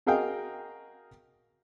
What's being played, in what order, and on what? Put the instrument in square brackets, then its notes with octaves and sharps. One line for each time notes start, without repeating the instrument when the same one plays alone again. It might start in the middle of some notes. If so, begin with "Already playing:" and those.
[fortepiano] F#4 G#4 A#4 D#5 F5 G5